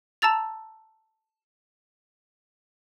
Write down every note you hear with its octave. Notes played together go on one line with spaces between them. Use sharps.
A5 A#5 E6 A6 F7